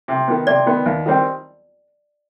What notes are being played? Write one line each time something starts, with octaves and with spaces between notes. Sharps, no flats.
C3
D#3 B3
C3 D5
D#3 B3
D#2
D#3 G3 C4